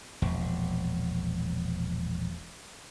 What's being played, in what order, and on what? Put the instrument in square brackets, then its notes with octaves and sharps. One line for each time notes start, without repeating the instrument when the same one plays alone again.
[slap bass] E1 A#1